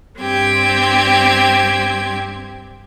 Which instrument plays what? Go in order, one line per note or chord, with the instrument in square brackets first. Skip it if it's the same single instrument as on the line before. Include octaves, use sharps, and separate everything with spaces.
[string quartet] G2 C4 G4 G#6